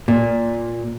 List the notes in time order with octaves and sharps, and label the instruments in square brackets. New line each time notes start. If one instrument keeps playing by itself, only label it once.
[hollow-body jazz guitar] A#2